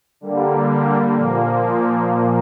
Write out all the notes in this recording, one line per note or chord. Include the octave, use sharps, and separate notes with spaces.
D3 G3 A#3
A#2 F3 A#3